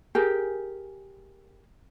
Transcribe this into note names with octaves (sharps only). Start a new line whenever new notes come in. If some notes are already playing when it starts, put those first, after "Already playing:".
G4 G#4 A#4